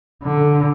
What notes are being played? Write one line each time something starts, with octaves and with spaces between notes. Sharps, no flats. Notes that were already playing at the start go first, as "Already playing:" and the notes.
D3